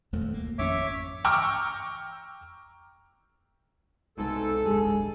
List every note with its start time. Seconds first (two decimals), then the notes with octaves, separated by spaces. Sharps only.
0.12 D#1 F2 A3
0.34 D2 A#3
0.58 G#1 F2 C#4 C#5 E5 D6
1.25 G5 A#5 C#6 D6 E6 F6
4.18 C2 G#2 B2 A4
4.65 D1 G1 G2 G#3 G#4